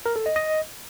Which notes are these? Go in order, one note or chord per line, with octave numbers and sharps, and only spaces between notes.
A#4
A4
D#5
D#5